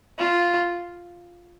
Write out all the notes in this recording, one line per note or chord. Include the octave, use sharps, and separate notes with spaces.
F4